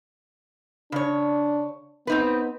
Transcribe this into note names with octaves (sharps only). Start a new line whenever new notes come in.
C#3 D4 C#5
B3 C4 D#4 B4